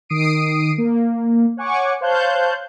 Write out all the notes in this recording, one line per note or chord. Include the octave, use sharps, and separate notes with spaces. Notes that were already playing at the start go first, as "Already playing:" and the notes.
D#3 D#6 C7 D7 D#7
A#3
C#5 F#5 G#5 C#6 D6
C5 C#5 F5 A5 F#6 G6